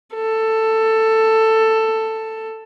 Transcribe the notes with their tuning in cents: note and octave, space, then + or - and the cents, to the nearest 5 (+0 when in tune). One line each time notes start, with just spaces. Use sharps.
A4 +10